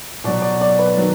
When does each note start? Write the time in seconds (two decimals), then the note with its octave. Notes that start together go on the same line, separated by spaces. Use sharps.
0.24 B2 F#3 D5
0.42 D5
0.61 D5
0.79 B4
0.97 D#3 F#3